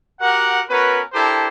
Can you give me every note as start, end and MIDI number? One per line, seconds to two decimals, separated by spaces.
0.20 0.61 66
0.20 0.61 67
0.20 0.61 70
0.20 0.61 78
0.69 1.00 59
0.69 1.00 61
0.69 1.00 66
0.69 1.00 70
0.69 1.00 71
1.13 1.48 62
1.13 1.48 64
1.13 1.48 67
1.13 1.48 69
1.13 1.48 70
1.13 1.48 72